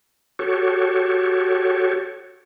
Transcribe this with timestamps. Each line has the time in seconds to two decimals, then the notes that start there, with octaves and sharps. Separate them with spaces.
0.39 F#4 G4 A4 C#5